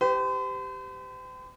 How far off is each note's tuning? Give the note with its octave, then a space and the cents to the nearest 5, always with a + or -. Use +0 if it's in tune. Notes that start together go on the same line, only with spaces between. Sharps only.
G4 +0 C5 -45